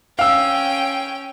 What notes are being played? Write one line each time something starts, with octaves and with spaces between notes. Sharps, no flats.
C#4 F5 G5 E6